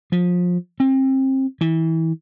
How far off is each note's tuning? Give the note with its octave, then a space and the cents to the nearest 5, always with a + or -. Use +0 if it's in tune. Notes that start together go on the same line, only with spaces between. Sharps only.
F3 +25
C4 +30
E3 -25